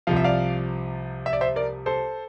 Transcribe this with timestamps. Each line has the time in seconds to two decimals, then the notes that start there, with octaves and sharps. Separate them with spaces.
0.07 C2 C3 F3 F5
0.16 E5
0.24 D5 F5
1.26 E5
1.33 D5
1.41 C5 E5
1.56 A#4 D5
1.86 A4 C5